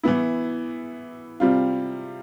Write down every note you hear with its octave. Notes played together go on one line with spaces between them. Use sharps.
E3 B3 E4
C3 G3 C4 F4